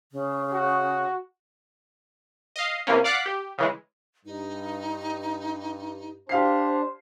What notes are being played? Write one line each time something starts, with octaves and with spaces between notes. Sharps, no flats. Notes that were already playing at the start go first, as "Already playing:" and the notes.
C#3
F#4
D#5 F5
C3 E3 A#3 C#4
D5 F5 F#5 D6 B6 C#7
G4
C#3 E3 G#3
G2 D#4
D4 G4 C5 F5 C7